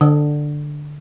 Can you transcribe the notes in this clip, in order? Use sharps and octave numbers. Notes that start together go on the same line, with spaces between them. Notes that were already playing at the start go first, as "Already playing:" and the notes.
D3